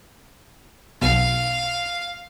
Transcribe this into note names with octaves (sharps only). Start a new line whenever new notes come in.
B1 B2 F5